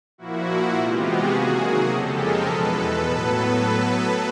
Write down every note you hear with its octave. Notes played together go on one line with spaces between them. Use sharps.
A#2 F3 A#3 E4 F#4
C3 E3 G#3 B3 F4 G4
F#4 G#4
C3 D#3 F#3 A#3
F#4 G#4
F2 C#3 F3 G#3 G4 A4
G#4 A#4
E2 B2 G#3 A4 B4
A4 B4
A2 F#3 B3